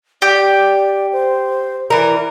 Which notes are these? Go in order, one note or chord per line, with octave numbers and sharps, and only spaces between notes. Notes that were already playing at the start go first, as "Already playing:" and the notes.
G4 D5
C5
E3 A#4 D5